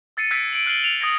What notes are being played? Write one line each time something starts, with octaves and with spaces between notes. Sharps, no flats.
E6 A6 C7 C#7 D#7
E6 F#6 G#6 B6 C7 D7
D7 F#7
F6 F#6 C7 D7 F#7 G7
C7 F7
D#6 G#6 A#6 D7